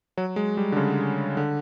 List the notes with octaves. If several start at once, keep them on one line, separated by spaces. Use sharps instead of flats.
F#3
G#3
G3
D3
C#3
D3